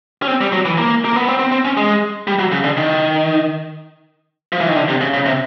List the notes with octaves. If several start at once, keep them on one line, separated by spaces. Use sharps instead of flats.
C#4
C4
G3
F#3
E3
A#3
A#3
B3
C4
C4
C4
C#4
G#3
G3
F#3
C#3
D3
D#3
F3
E3
D#3
D3
C3
C#3
C#3
C3